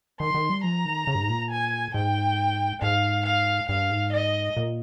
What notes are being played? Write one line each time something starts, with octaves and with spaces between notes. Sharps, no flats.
D#3 C6
D#3
G3
F3 A#5
D#3
C#3
G2
G#2
A#2
G#5
G#2 G5
G#2 F5
F5
G2 F5
G#2
D#5
A#2